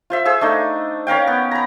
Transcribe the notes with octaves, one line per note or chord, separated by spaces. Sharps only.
F4 C5 E5
G#4 C5 E6
A3 D4 D#4
C#4 A#4 F5 G5
B3
A#5 B5